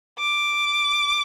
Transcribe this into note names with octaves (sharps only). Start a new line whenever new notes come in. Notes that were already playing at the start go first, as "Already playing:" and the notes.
D6